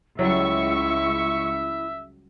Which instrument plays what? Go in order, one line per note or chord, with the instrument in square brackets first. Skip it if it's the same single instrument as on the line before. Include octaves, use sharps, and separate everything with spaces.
[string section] C#2 C#6 [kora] F#3 G3 [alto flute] E4 [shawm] E5